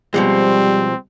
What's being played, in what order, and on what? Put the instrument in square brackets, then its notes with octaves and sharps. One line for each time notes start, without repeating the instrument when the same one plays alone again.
[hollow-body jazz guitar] B2 F3 G#3 [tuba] G3 [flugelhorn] C4